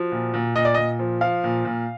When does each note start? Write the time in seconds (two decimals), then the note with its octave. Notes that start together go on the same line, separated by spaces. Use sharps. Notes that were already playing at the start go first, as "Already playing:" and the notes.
Already playing: F3 F#4
0.12 A#2
0.34 A#2
0.56 A#2 D#5
0.65 D5
0.75 A#2 D#5
0.99 F3
1.21 F3 F5
1.44 A#2
1.65 A#2